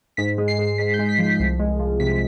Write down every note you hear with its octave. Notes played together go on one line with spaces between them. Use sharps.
G#2 B6
G#3
C7
G#2
G#2 B6
G6
G#3
B6
F3
B6
C2
G#3
F3
C3 B6